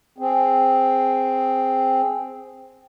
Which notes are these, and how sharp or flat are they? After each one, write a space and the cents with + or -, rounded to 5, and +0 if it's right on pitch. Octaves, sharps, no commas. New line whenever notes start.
C4 +0 G#4 +0